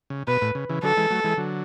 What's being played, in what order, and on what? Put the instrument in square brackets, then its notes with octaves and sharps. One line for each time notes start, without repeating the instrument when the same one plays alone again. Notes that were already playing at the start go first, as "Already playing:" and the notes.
[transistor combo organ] C#3
[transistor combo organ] B2 [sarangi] B4
[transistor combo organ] A2
C#3
C#3 E3
[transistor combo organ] D3 F#3 [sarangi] A4
[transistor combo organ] E3 G#3
F#3 A3
E3 G#3
D3 F#3